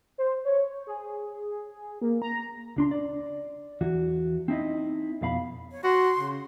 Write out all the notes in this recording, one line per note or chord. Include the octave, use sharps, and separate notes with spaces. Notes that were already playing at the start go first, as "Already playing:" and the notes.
C5
C#5
G#4
A#3
A#5
C#2 D4 C6
D5
E2 E3 F#4
C4 D#4 E4 D#5
F2 B2 F5 B5
C#5
F#4 C6
C#3